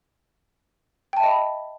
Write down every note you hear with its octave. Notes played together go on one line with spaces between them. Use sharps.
D#5 E5 G5 A5 B5